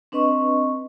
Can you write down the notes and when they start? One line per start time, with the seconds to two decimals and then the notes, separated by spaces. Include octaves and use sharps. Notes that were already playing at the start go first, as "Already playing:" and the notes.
0.12 C4 D4 B4 D#5 C#6